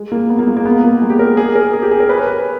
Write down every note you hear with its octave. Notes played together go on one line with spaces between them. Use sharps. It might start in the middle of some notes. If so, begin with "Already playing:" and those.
Already playing: G#3
A#3
B3
A#3
G#3
A#3
B3
A#3
G#3
G4
A#4
G#4
A#4
G#4
G4
G#4
A#4
B4
C#5
B4